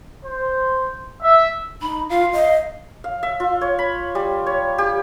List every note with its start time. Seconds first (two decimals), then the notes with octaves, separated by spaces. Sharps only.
0.24 C5
1.21 E5
1.81 D#4 B5
2.10 F4 F5
2.33 D#5
3.04 F5
3.23 E5
3.40 F4
3.61 C#5
3.79 B5
4.15 G3
4.46 C#5
4.78 G4